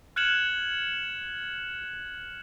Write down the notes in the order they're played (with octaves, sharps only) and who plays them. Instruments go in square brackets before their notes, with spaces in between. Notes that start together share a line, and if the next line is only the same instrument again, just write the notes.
[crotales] F6 F#6 G#6 C#7 E7 F#7